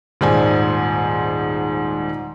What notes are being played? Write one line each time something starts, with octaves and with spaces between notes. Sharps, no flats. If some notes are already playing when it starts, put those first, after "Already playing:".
D#1 G#2 C5 D5 G#5